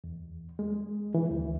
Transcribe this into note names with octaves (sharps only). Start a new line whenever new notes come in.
E2
G#3
E3
D2